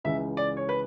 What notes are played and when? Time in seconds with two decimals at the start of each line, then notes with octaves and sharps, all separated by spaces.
0.04 C#2 C#3 E3 E5
0.37 D5
0.57 C#5
0.69 B4